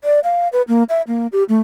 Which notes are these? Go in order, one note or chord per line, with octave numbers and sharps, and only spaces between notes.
D5
F5
B4
A#3
E5
A#3
G4
A3